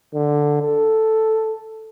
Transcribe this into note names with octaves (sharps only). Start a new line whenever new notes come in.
D3
A4